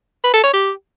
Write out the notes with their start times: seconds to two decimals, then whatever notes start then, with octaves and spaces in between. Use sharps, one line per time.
0.24 B4
0.34 A4
0.44 C#5
0.53 G4